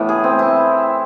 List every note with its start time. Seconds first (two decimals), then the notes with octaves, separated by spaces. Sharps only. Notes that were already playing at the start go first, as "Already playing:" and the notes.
Already playing: A2 E3 B3
0.09 G#4
0.24 C4
0.39 E4